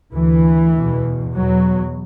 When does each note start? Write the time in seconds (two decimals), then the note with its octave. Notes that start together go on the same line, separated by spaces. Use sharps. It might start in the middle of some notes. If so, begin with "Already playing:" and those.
0.14 D2 E3
0.75 E2 B2
1.34 E2 B2 F#3